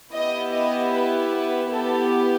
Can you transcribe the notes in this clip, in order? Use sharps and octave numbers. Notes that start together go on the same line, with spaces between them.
B3 E4 G4 D#5
D#5
B4
B4
B3 E4 G4 A4